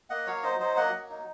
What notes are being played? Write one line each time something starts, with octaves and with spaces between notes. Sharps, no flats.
A#3 D#5 F#5
F#3 C#5 F5
D#4 C5 D#5
F#3 C5 D#5
A#3 D#5 F#5
F#3
D#4